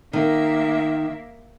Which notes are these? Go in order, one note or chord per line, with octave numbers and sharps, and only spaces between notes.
D#3 A#3 E5